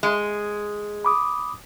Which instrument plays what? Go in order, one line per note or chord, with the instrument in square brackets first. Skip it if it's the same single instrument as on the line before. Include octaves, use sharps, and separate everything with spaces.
[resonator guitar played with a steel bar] G#3
[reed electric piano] B5 D6 D#6